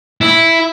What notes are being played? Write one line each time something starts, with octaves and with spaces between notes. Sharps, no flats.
E4